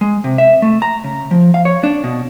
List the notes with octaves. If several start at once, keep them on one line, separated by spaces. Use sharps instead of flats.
G#3
C3
E5
A3
A#5
C#3
F3
F5
C#5
D4
B2